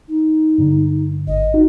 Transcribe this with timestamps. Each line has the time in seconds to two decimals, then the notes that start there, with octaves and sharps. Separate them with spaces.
0.08 D#4
0.58 G2 D3
1.27 G#1 D#5
1.54 D#4 F#4